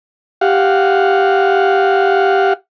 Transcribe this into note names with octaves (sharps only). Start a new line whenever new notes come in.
G4 F5 F#5